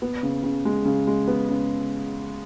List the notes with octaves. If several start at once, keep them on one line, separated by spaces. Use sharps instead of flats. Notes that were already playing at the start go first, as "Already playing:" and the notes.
B3
C#3
C#3
G#3
C#3
G#3
B3
C#3